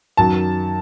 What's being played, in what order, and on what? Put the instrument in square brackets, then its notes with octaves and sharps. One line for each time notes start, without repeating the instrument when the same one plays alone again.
[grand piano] F#2 D#3 F#3 [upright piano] A5